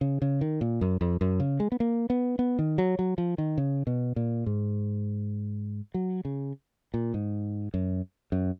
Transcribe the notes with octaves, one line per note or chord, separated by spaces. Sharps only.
C#3
C#3
D#3
A#2
F#2
F2
F#2
C#3
G#3
B3
A#3
B3
B3
D#3
F#3
F#3
F3
D#3
C#3
B2
A#2
G#2
F#3
C#3
A#2
G#2
F#2
F#2